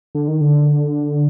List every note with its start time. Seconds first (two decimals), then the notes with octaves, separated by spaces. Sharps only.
0.15 D3
0.28 D#3
0.41 D3